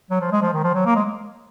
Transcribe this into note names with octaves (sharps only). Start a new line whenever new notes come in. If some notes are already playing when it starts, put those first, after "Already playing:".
F#3
F3
G#3
F3
D#3
F3
F#3
A#3
G#3